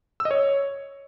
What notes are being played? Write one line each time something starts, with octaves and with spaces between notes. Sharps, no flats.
E6
D#5
C#5